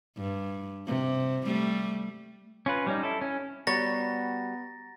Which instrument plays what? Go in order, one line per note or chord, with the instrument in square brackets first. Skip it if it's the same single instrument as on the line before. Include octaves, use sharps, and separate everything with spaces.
[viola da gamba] G2
C3
G3 A3
[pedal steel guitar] C#4 F4 B4
G3 C#4 D#4
E4 A4
C#4
[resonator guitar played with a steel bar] G3 F#4 [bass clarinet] B3 [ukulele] C#5 [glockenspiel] A#5 A6 A#6